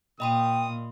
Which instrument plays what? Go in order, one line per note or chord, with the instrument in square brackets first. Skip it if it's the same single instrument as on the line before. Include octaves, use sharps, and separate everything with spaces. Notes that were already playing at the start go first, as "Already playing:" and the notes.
[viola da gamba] A#2 [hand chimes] D#5 B5 C6 [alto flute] G5 [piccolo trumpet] D#6